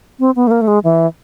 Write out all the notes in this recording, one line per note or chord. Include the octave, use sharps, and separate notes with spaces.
C4
B3
A3
A#3
A3
G#3
E3